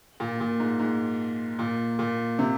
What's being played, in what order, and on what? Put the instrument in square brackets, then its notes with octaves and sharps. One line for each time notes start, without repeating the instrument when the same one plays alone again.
[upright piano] A#2
A#2
G#2
G#2
A#2
A#2
C3